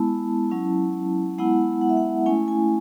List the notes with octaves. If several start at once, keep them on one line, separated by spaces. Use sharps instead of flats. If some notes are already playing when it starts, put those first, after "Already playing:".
Already playing: G#3 B3 E4 A5
F#3 C#4 E4
G#3 B3 E4 F#5
F#5
E5
F#5
A3 C#4 E4 G#5
G#5